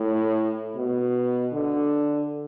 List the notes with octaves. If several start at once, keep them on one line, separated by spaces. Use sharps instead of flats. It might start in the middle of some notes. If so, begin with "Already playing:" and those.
Already playing: A2
B2
D3